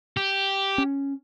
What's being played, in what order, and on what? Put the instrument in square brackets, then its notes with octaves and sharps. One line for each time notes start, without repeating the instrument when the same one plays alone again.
[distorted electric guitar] G4
[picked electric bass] C#4